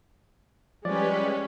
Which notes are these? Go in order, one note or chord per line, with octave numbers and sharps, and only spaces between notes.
F3 G3 G#3 C#4 G4 B4 D5 B5